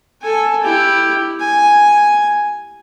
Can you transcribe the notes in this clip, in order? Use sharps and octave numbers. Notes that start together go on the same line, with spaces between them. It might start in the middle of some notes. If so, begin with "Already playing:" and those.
A4 G#5
E4 G4
G#5